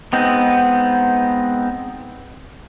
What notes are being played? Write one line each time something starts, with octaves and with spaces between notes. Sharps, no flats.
G#3 B3 C4 D#4